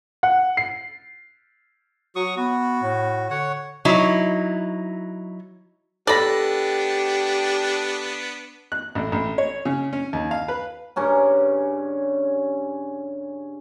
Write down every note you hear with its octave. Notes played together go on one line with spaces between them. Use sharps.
F#5
C7
F#3 F#4 C#6 D#6
B3 F#4
A2
D3 C#5 F#5
F#3 D#4 E4
B3 D4 G4 A4 D5 B5 A#6
F#6
A1
A1
C#5
C#3
C#4
D#2
F5
B4
G2 C#3 C#4 A#5